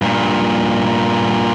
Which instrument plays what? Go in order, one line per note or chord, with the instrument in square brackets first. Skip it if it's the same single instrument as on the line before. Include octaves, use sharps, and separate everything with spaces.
[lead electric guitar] G2 A#2